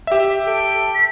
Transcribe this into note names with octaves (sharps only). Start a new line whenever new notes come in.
G4 E5
A4 G5
B6